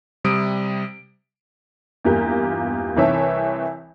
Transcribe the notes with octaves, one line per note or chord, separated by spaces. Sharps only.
C3 G3 D#6 D7
E2 G2 A#3 F4 G4 A#4
C2 C3 E3 C#5 E5 A5